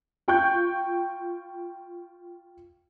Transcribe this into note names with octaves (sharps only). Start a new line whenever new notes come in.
F4 G5 C#6 F#6 G6